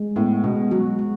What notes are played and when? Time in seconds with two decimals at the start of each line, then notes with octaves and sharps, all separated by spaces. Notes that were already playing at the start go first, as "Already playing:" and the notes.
Already playing: G#3
0.16 A2 B3
0.44 B2 G#3
0.71 F#3 F#4
0.99 G#3